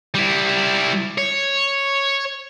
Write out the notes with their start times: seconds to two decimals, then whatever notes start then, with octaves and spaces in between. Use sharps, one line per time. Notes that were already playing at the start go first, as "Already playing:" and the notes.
0.15 G3 E4
1.18 C#5